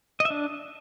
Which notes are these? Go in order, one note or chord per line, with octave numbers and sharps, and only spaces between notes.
D#5
E5
D4